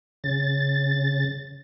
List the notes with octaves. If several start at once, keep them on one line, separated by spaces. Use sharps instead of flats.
C#3 A6